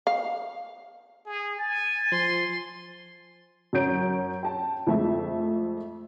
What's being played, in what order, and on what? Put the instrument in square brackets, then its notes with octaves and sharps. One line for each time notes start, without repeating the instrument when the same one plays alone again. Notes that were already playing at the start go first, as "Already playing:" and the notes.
[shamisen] F5
[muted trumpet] G#4
[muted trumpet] G#5 [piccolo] A6
[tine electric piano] F3 [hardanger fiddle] C6
[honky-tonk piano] F#2 F#3 C#4 G6 D7
G5 A5
F2 G#3 A3 E5